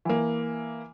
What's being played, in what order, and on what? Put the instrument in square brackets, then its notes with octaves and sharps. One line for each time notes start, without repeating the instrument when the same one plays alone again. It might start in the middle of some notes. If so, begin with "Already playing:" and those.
[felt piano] E3 A#3